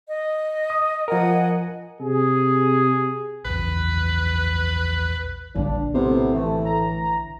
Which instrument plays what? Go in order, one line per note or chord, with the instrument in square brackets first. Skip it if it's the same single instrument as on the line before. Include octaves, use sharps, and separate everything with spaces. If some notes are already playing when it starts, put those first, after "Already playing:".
[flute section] D#5
[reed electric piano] D#6
[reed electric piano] F3 A#4 [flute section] D#5 F#5 G#5
[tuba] C3 [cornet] G#4
[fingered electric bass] A#1 E2 [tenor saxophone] B4
[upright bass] A#1 D3 [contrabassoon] G2 [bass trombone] D4
[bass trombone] A2 [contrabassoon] C3 [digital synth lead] B3
[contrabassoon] E3 [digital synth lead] A3
[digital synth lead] A#5